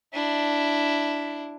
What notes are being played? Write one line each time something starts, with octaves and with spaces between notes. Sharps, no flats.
D4 E4